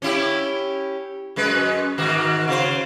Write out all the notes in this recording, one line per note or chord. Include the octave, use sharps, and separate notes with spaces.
C#4 E4 G4
F#2 G#3 B4
G#2 D#3 F#4
C#3 C5